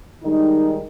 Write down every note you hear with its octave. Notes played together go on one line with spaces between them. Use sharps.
D#3 G3 G#3 D#4